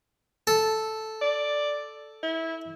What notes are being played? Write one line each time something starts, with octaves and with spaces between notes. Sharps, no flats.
A4
D5
E4